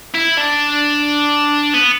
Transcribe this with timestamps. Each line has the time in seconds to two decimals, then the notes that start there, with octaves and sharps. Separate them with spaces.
0.15 E4
0.38 D4
1.74 B3